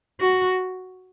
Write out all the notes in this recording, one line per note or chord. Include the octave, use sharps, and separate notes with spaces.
F#4